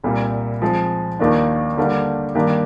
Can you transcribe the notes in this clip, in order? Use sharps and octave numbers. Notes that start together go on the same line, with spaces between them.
C2 A#2 G3 A#3
F3 G#3 C4
D#2 D#3 A#3 D4 F4
D3 G3 A#3 D4
G2 D#3 A#3 D4 G4